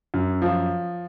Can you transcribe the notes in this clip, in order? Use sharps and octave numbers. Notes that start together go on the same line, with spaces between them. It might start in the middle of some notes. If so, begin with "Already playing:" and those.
F#2
F3